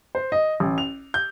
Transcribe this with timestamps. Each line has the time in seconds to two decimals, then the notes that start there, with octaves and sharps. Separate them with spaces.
0.15 C5
0.32 D#5
0.60 A1
0.78 F7
1.14 G6